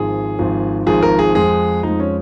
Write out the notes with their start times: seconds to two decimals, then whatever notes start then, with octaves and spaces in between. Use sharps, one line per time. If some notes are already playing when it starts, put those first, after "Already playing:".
Already playing: G#1 G#2 F3 G#4
0.39 G#1 G#2 F3
0.86 G#1 G#2 F3 G#4
1.03 A#4
1.19 G#4
1.35 F2 F3 G#3 G#4
1.83 F2 F3 G#3 D#4
2.00 C#4